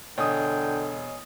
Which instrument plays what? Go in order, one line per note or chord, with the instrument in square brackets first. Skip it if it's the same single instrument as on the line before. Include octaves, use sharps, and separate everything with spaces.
[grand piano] E1 D#6 [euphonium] D3 [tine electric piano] C#5 D#5 G#5 [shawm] G5